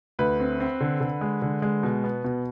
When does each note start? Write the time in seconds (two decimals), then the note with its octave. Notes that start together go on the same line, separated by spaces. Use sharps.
0.19 D2 B4
0.40 C4
0.60 C4
0.81 D3
1.01 D3
1.21 G#3
1.42 D3
1.62 G#3
1.83 B2
2.04 B3
2.24 B2